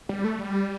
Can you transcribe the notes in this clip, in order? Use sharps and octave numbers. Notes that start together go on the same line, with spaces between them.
G3
A3
G3